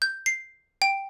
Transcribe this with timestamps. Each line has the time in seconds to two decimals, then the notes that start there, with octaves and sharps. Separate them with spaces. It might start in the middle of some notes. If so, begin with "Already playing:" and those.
0.02 G6
0.26 C7
0.82 G5